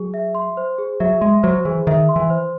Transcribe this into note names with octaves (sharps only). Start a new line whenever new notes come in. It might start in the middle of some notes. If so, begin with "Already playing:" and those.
Already playing: F#3 G#4
E5
C6
C5
G#4
F#3 E5
G#3 C6
F#3 C5
E3 G#4
D#3 E5
C6
E3
C5